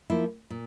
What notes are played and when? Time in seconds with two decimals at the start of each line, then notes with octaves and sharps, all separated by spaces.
0.10 F3 A#3 E4
0.50 A#2